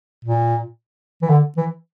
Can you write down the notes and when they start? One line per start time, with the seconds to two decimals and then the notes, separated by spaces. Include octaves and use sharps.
0.25 A#2
1.22 E3
1.29 D3
1.57 E3